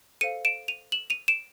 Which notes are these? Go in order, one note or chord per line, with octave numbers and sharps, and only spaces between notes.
A4 C5 F5 C#7 D#7
D7 E7
D#7 F7
E7 F#7
D#7 F7
D7 E7